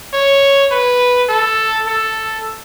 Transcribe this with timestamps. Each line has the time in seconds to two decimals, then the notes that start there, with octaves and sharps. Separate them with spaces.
0.14 C#5
0.71 B4
1.29 A4
1.87 A4